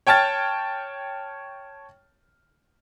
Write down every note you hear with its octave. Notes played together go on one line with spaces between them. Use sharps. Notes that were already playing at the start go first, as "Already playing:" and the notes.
C#5 G5 A5 F6 A6